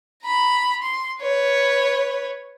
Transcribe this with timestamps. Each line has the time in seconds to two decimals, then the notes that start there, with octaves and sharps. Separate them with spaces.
0.24 A#5 B5
0.83 C6
1.22 B4 C#5